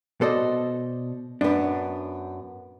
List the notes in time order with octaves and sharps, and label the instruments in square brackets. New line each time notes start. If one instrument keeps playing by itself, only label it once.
[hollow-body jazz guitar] B2 A4 [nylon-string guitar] C5 D5 D#5
[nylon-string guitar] F#2 B3 [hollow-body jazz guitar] D4